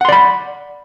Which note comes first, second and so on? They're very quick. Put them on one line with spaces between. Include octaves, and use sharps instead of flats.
F#5 C6 D5 B5